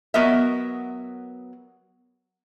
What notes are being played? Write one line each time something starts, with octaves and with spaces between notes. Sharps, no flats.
F#3 B3 A#4 D#5 E5